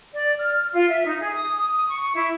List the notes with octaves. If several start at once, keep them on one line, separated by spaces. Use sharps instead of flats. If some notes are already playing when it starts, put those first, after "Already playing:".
D5
F6
F4
E5
D#4
G#4
D#6
D#6
D#6
C#6
E4